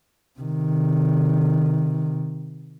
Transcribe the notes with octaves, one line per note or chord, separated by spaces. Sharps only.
C3 D#3